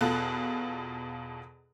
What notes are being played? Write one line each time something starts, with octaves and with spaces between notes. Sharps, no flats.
E2 B2 F4 A4 F#6